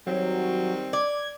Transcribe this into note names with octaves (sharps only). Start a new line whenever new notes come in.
D#3 F#3 G3 C4
D5 G#6